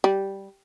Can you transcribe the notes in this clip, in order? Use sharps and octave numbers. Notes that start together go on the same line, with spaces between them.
G3